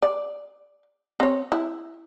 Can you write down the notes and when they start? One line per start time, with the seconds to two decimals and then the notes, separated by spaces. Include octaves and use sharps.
0.02 D5
1.20 C4 C#5
1.52 E4